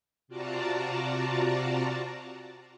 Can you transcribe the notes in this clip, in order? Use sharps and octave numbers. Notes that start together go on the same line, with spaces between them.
C3 F4 F#4 D5 A5 A#5